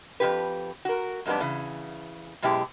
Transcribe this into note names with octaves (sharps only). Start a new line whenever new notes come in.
F2 C#3 G4 B4
F#4 A#4
F2 G#2 G3 B3 D4
C#3 E3
F#2 B2 G#3 E4 G4